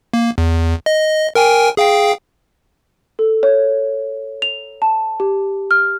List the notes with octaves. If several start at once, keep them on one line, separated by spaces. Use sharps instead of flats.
A#3
E2
D#5
A#4 G5 G#5
G#4 F5 G5
A4
C#5
F7
A5
G4
F6